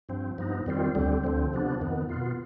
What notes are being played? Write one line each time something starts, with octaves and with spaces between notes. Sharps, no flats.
G2 F3 C4
G2 F3 B3 D#4
F2 D#3 G3 C4 F4
D2 D3 G3 C4
D2 D3 F3 C4
C3 F3 B3 D4
F2 D#3 B3
B2 B3 F4